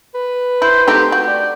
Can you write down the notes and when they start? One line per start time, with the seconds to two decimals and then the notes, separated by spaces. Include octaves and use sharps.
0.15 B4
0.62 E4 C5
0.88 A3 C4 D#4 G4
1.12 F#4 G5
1.27 D5